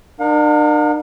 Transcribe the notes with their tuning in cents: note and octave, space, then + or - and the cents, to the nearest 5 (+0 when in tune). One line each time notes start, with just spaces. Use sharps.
D4 +45 A#4 +0 F5 +45